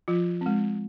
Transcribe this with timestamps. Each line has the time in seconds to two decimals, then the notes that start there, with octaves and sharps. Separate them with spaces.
0.08 F3 F4
0.41 G#3 C4